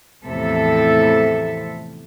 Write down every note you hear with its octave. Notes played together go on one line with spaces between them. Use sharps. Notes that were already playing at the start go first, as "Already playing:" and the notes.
E2 A2 C3 F3 A4 E5